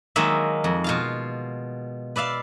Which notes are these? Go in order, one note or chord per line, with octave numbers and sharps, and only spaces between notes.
D#3 F#3 G#3 A#3 E5
F2
B2 F4 F5
B4 D5 E5 F5